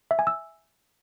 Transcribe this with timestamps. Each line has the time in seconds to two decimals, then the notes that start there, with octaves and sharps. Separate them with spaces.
0.11 E5
0.19 G#5
0.27 E6